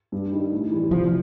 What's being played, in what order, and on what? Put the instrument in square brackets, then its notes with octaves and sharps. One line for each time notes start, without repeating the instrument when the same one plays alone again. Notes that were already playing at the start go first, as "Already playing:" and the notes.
[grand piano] G2
D#3 G3
A2
E3 G3
[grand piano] C3 [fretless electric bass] F3